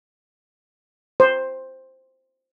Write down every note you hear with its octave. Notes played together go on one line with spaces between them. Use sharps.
C5